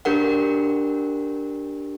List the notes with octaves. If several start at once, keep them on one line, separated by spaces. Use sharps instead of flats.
D4 G4 A#4 F#5